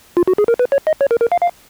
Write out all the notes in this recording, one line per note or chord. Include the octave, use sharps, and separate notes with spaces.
F4
F#4
G#4
A#4
B4
C#5
D#5
C#5
A#4
A#4
F5
F5